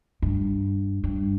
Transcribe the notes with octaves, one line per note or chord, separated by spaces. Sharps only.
G2
G2